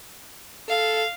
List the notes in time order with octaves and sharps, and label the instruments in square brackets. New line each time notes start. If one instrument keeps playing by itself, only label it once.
[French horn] A4 [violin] F5